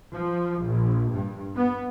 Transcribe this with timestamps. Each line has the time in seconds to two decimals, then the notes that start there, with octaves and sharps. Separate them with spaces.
0.13 F3
0.63 A#1
1.13 G2
1.56 B3